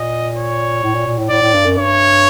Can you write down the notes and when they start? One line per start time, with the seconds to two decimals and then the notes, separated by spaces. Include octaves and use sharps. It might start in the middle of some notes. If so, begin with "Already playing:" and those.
Already playing: A#2 D#5
0.36 C#5
0.83 A2
0.95 A#2
1.07 A#2
1.18 A2
1.29 A2 D5
1.42 A2
1.54 G2
1.65 F#2
1.77 G2 C#5